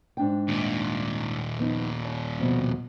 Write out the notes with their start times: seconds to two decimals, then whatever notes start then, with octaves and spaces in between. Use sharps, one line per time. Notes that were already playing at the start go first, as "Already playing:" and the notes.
0.17 G#2 D4 G5
0.48 D#2 A#2
1.57 F3 B3 D#4
2.04 C#5
2.39 F2 B2